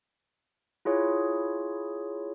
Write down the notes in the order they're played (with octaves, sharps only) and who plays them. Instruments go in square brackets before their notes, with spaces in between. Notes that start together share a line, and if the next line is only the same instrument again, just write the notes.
[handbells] E4 F4 G#4 C#5